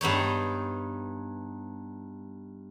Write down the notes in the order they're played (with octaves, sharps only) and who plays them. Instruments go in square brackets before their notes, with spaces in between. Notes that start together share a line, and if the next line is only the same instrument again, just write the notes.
[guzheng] G2 B3 D#4 C#5